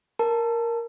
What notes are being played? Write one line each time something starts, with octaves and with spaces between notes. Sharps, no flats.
A#4 A5